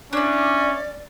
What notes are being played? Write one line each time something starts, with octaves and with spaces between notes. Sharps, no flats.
C#4 D4 E4 D5